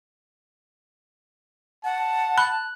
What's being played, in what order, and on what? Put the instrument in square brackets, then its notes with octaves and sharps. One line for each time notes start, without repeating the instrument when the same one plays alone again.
[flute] F#5 [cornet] A5
[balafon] B5 [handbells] F#6